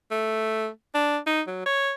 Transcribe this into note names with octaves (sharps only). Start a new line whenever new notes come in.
A3
D4
D#4
F#3
C#5